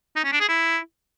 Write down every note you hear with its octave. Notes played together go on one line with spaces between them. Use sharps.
D#4
C#4
D4
G#4
E4